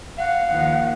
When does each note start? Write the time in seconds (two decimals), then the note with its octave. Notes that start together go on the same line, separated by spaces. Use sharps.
0.18 F5 F#5
0.49 D#2 D#3 F3